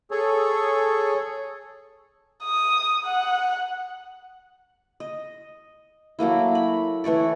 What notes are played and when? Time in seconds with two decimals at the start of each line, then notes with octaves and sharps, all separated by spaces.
0.11 G#4 A4 C#5
2.44 D#6
3.05 F#5
5.00 D#5
6.19 F#3 A3 A#3 E4
6.55 B5
7.04 E3 A3 C#5 D5